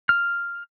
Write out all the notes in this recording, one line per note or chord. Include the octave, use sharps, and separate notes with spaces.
F6